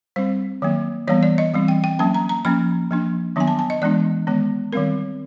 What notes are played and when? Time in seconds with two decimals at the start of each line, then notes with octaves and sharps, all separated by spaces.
0.16 G3 C4 C5
0.62 D#3 F#3 A#3
1.07 E3 G3 B3 C#5
1.23 D5
1.38 D#5
1.54 E3 G3 C4
1.68 G5
1.84 G5
1.99 F#3 A#3 C#4 A5
2.14 A#5
2.29 A#5
2.45 F3 A#3 C#4 B5
2.91 F3 A#3 D4
3.36 D#3 F#3 B3 D4 G#5
3.48 A5
3.59 A5
3.70 D#5
3.82 E3 G#3 B3 D4 D5
4.27 D#3 G#3 B3
4.73 D#3 G3 C4 A#4